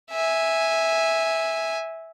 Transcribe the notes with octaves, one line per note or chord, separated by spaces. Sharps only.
E5 G#5